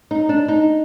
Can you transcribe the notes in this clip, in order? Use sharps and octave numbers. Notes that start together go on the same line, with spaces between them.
D#4
D4
D#4